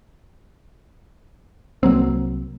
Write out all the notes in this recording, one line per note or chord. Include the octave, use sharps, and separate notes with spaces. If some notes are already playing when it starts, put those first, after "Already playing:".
C2 F#3 A#3 C4